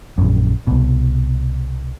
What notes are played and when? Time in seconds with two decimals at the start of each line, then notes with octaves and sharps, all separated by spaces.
0.18 A#1 F#2
0.67 C2 B2